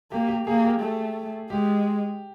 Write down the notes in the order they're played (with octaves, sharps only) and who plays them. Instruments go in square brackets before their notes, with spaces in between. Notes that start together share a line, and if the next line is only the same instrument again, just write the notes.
[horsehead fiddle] A#3 [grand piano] G4
[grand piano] G4
[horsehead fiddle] A#3 [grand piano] G#4
[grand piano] G4
[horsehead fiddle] A3
[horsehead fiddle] G#3 [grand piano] G4